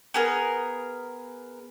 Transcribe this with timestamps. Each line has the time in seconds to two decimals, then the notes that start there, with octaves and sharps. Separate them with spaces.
0.14 B3 G#4 A#4